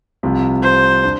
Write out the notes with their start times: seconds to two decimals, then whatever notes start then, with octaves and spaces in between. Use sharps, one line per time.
0.23 C2 C3 F3
0.63 C5
1.04 D4